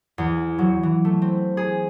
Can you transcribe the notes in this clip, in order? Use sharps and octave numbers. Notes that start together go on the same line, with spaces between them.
E2
F#3
E3
A3
C4
G#4